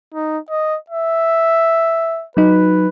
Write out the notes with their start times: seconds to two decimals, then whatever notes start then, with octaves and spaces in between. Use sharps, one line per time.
0.14 D#4
0.50 D#5
0.90 E5
2.37 F#3 D#4 B4